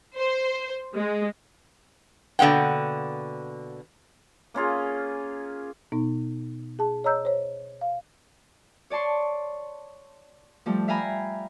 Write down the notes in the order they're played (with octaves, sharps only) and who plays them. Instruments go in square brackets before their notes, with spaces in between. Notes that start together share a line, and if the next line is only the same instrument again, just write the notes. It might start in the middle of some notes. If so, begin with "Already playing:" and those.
[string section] C5
G#3
[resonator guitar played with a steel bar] B2 D3 A#3 F#5 G5
[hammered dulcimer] A#3 C#4 F4 G#4
[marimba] B2 B3 D#4
G#4 A5
C#5 D#5 A#5 E6 G6
C5 C#5
F5
[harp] C#5 D5 A5 C6 C#6
F3 G3 A3
E5 F5 G5 G#5 A#5 B5